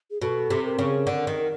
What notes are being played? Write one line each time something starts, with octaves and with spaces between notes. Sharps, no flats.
G#4
B2 A4
C3
A#4
C#3
D3
D#3